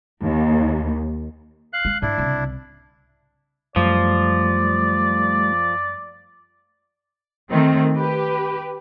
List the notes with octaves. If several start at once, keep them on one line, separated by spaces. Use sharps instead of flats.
D#2
F5 F#6
G#3
G#2 D4 E4
C2 C#3
F#2 F3 G3 A3 D5
D#3 A3 C4
G4 B4